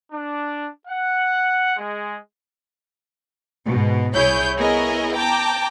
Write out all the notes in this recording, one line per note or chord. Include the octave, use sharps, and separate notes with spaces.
D4
F#5
G#3
G#2 B2
C2 E4 G#4 C#5 G6
B3 E4 G#4 A#4 C#5 D#5
G5 A5 A#5 D6